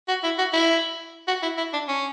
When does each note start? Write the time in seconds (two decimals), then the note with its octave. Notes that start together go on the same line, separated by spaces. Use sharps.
0.08 F#4
0.23 E4
0.38 F#4
0.53 E4
1.28 F#4
1.42 E4
1.57 E4
1.73 D4
1.88 C#4